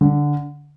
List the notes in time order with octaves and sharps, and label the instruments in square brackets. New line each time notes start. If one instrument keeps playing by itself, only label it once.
[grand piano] D3